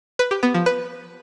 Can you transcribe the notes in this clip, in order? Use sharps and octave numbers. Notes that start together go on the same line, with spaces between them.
B4
G4
B3
F3
B4